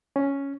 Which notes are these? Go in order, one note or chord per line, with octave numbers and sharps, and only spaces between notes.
C#4